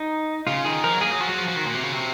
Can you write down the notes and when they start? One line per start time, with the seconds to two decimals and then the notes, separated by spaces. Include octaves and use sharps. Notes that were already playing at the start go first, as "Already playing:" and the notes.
Already playing: D#4
0.47 C#3 F4
0.65 D#3 G#4
0.84 F3 A#4
0.93 F#3
1.01 A#3 G#4
1.11 F#3
1.20 F3 F#4
1.29 F#3
1.38 F3
1.48 F3
1.56 D#3
1.66 A#2
1.74 C3
1.83 C#3
1.92 C3